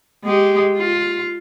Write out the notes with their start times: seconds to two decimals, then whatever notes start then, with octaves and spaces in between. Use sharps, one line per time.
0.24 G#3 G4
0.77 F4